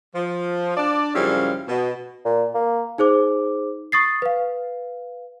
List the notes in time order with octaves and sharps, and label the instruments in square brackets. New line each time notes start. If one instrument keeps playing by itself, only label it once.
[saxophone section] F3
D4 D5
F#2 C#3 F3 G3 E4 F5
B2
[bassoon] A#2
A#3
[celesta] D#4 G#4 C5 D6
C#6 D#6 A6 C7
B4 F5